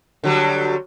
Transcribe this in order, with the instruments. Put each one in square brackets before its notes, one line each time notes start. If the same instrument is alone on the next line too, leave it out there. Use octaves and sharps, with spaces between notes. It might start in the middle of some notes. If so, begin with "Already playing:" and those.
[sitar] D3 F#3 G3